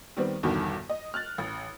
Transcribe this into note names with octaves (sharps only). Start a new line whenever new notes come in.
D#3 G3 B3 C4
G1 E2 G2 B2 D#3
D#5
F6 F#6 A6
A1